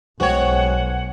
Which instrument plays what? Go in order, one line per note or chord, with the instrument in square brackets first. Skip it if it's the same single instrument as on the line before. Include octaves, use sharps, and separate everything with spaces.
[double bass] B1 [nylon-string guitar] G#3 C5 G5 [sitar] F#4 C#5 [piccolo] F#5